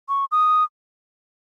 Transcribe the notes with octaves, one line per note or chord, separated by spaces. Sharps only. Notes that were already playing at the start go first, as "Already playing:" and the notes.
C#6
D#6